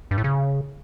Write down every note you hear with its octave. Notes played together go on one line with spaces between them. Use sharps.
G2
A2
C#3